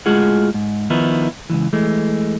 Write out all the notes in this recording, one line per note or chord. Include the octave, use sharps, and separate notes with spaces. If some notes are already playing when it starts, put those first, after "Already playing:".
A2 G#3 F4 F#4 G#4 F#5
G#2
D#3 F3 B3 D#4 E4
C#2 G2 E3
E3 G#3 A3